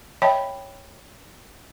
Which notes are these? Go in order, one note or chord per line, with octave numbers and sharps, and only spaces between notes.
C#5 D#5 E5 G5 A5 B5